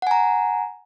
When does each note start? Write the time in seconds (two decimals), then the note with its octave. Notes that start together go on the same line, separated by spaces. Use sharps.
0.02 F#5
0.07 G#5
0.11 A#5